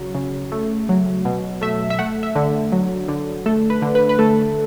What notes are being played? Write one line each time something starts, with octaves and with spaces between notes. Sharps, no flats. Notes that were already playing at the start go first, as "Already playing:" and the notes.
Already playing: C#3 F#3
C#3
A3
F#3
B2
A3 E5
E5
A3 F#5
E5
D3
F#3
D3
A3 A4
B4
D3
B4
B4
A3 A4